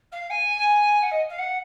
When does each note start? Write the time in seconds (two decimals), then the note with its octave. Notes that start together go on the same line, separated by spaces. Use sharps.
0.11 F5
0.30 G#5
1.02 F#5
1.11 D#5
1.29 F5
1.38 F#5